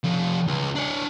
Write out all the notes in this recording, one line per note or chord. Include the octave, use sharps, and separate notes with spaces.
F3 A3
C#2
D4 C#5